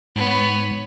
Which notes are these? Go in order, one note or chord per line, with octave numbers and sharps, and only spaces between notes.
G#2 B3 C#5